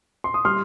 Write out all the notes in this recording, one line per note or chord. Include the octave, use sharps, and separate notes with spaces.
C6
D#6
G3 C6 F6